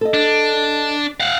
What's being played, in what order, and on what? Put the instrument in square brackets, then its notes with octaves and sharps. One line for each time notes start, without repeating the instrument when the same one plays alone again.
[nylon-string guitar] A4 D#5
[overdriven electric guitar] D4
F5 F#5